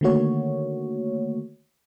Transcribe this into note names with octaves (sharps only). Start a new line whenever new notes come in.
D3 D#3 A3 A#3 F#4 C#5